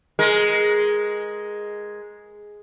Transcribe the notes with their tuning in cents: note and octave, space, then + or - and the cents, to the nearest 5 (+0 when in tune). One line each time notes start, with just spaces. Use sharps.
G#3 +0 A#4 +25